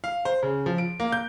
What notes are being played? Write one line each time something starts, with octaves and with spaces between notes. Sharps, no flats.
F5
C5
C#3
F3
D7
A#3
G6